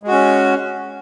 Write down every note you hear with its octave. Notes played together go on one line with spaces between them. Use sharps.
G#3 C#4 F#4